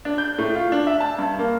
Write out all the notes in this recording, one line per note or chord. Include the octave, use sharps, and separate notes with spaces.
D4
G6
A2
F4
D4
E5
A5
G2
A#3